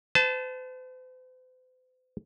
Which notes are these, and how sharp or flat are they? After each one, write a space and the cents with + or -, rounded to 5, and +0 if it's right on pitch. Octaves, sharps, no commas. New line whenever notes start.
C5 -45 A5 -10